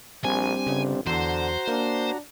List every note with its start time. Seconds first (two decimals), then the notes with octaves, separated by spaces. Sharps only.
0.24 A#1 G3 C4 D4 G#5
0.67 G1 C#3
1.07 E2 D3 F#4 C5 A#5
1.68 A#3 D4